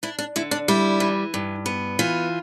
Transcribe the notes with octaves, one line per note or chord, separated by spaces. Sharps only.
D4 E4
D4
D3 E4
D4
G3 E4
E3
G2
B3
E3 F4